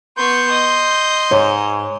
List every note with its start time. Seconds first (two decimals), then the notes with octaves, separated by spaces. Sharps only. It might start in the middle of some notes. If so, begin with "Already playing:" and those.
0.17 B3 C6 C#6 G6
0.51 D#5
1.31 G#2 C#5